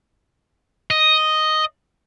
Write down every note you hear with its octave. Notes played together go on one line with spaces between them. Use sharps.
D#5